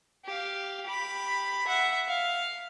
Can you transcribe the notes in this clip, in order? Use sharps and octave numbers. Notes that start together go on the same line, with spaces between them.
G4 F5
G4 B5
E5 F#5
F5